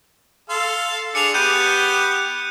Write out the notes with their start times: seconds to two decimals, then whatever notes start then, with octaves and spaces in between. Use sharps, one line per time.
0.50 A4 F5 C6
1.15 D4 G#4 A5 C#7 F7
1.34 B3 G4 F#6 G6 D#7